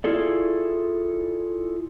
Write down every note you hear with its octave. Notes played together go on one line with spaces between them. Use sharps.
E4 F4 G#4 A4 D5